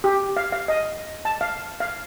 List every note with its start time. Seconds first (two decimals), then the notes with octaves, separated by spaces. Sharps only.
0.04 G4
0.37 F5
0.52 F5
0.68 D#5
1.25 A5
1.41 F5
1.80 F5